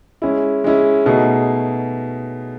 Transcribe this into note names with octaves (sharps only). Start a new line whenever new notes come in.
G#3 C#4 E4
G#3 C#4 E4
B2 A3 D#4 G#4